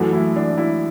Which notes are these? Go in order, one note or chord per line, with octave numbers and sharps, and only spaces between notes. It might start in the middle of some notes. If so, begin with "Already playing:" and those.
Already playing: F#2 E3 A3 F#4
E4
D4
E4